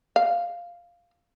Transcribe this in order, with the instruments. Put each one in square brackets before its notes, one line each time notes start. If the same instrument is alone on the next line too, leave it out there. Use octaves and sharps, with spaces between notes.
[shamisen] F5